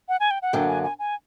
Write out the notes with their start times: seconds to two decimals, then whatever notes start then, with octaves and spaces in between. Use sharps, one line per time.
0.09 F#5
0.20 G#5
0.31 G5
0.42 F#5
0.53 F#2 D3 F#3 A#3 G5
0.68 G#5
0.83 G#5
0.99 G#5